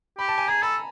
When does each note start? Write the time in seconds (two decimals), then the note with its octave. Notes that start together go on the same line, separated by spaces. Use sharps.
0.18 G4 B5
0.28 A5
0.38 G#5
0.48 G#4 A#5
0.62 A4 B5